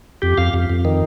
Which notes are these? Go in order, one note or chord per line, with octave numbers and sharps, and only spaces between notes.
F2 G4
F2 F5
F2
F2
D#3